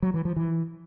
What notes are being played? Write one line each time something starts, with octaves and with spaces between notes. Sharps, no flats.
F#3
E3
F3
E3